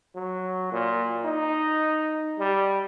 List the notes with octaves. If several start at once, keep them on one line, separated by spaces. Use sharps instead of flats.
F#3
A#2
D#4
G3